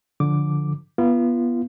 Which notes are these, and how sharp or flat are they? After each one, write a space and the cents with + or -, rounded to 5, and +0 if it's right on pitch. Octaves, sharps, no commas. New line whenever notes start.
D3 -5 F3 +0 D6 +0
B3 -20 F4 -35